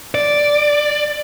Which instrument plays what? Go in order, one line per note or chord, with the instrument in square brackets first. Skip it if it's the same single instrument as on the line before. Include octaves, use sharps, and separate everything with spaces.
[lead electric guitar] D5